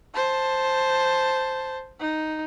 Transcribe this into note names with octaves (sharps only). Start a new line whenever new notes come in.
C5 A5
D#4